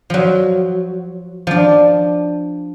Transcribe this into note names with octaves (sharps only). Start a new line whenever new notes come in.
F3 F#3
F3 D4